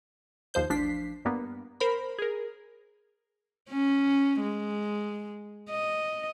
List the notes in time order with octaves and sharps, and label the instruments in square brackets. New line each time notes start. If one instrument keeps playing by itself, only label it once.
[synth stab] D#2 F3 C5 G6
A1 F3 D4 B6 C7
G2 A#3 B3
A#4 C5 B5
G#4 A#4
[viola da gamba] C#4
G#3
D#5